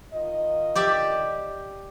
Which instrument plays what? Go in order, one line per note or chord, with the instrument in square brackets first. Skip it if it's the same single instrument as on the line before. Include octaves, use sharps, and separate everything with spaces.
[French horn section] D#3 F4 D#5
[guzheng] G4 D5 E5